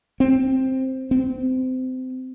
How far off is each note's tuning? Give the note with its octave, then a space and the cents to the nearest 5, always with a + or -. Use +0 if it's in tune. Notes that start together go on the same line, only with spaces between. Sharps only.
C4 +5
C4 -25